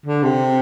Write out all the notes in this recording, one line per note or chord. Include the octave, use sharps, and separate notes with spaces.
D3
C3